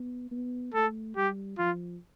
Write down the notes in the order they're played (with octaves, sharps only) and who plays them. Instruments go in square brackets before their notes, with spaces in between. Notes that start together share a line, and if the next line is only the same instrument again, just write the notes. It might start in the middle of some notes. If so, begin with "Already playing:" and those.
Already playing: [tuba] B3
B3
[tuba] A3 [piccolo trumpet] A4
[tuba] G3 [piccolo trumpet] G4
[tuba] F3 [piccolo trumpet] F4